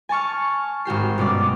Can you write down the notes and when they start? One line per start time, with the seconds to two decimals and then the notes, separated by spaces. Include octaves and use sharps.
0.09 G#5 A5 C#6 F6
0.85 G#1 F#4 G4 C7
1.18 G1 B2 C#4 D5